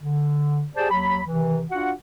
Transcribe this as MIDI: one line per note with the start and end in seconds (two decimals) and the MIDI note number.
0.01 0.64 50
0.75 0.91 67
0.75 0.91 68
0.75 0.91 72
0.75 0.91 74
0.75 0.91 81
0.91 1.21 39
0.91 1.21 54
0.91 1.21 83
1.26 1.63 48
1.26 1.63 51
1.26 1.63 52
1.71 1.91 62
1.71 1.91 65
1.71 1.91 66
1.71 1.91 78